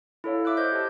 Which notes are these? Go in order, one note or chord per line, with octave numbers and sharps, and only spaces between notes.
E4 A4 C#5 F5
E5 D6 E6 F#6
C5 D#5 G6
G4 A5